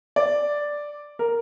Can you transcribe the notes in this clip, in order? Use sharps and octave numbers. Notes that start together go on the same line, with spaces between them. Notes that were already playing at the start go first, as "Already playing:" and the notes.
D5
A#4